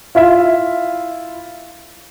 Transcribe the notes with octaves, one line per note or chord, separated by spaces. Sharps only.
E4 F4 E5